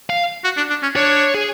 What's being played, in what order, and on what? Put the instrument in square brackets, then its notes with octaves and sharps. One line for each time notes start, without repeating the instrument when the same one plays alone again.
[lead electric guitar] F5
[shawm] F#4
D4
D4
C#4
[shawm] D4 [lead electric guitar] C#5
[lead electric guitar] G#4